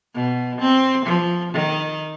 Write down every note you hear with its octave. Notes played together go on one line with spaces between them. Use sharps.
B2
C4
F3
D#3